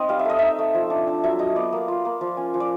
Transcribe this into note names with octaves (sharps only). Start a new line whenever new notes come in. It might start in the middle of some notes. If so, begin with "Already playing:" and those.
Already playing: C4 D#4 D#5
G3 F5
E5
A3 D#5
D#4 E5
A3
F3
D4
D4
F#3 E5
F#3 D#5
B3 D5
A#3
F4
A#3
F3
C#4
F3
D5